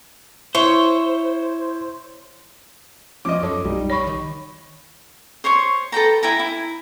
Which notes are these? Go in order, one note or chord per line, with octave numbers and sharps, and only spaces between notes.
E4 C5 C#5
F3 C#4 D#5 D6
F#2 A4 C#5
B1 G3 D#4
C#5 B5 C#6
D#3
C5 C#5 C6 C#6
A4 B4 G5 A#5
E4 G5 G#5 A#5
E4